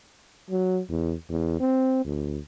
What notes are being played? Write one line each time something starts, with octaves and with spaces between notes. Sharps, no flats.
F#3
E2
E2
C4
D2